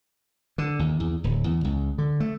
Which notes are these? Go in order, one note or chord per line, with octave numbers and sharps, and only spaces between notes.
D3
D#2
E2
D1
E2
C#2
D3
A3